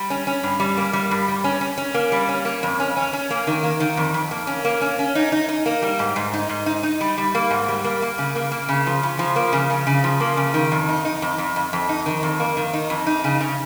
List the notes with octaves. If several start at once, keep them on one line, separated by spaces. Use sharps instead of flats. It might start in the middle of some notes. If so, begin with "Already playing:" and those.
Already playing: G3
C#4
C#4
G2
G3
A#3
G3
G2
G3
C#4
C#4
C#4
A#3
G3
C#4
A#3
F2
C#4
C#4
C#4
A#3
D#3
A#3
D#3
F2
F2
A#3
C#4
A#3
C#4
C#4
D#4
D#4
D#4
A#3
G3
G#2
G#2
D#4
G#2
D#4
D#4
G3
G3
A#3
G#2
G3
A#3
A#3
C#3
A#3
A#3
C#3
F3
C#3
F3
A#3
C#3
C#3
C#3
F3
A#3
C#3
D#3
F2
D#4
D#4
F2
F2
F2
F2
D#4
D#3
F2
A#3
D#3
D#4
F2
D#4
C#3
C#3